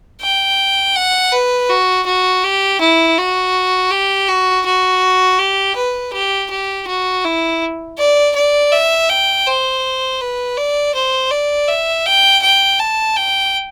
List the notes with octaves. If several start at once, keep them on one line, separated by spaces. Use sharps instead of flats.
G5
F#5
B4
F#4
F#4
G4
E4
F#4
G4
F#4
F#4
G4
B4
G4
G4
F#4
E4
D5
D5
E5
G5
C5
B4
D5
C5
D5
E5
G5
G5
A5
G5